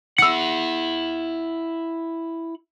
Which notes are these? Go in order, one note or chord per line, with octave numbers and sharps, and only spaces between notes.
E4 F#5 E6 C#7